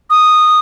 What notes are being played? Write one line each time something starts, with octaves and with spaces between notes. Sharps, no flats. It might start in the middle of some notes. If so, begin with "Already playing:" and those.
D#6